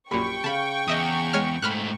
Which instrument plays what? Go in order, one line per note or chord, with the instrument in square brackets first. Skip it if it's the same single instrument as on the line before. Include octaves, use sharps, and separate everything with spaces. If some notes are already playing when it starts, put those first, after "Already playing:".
[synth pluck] A#1 F#2 A#2 [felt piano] G4 B5 [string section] G5 C#6
[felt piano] C#3 F5 [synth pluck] A5 B5
[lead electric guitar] E2 [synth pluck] D#5 E5 D#6
[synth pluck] G#3 C#5 F6
[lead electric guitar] G#2 A3 [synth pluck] B5 F6 F#6